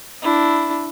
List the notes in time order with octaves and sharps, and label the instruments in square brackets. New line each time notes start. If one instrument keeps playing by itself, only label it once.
[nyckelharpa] D4 E4